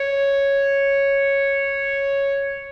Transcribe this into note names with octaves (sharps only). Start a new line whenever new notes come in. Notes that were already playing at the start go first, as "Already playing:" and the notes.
Already playing: C#5